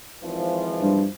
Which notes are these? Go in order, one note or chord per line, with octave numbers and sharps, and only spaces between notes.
G#1 E3 F3
G2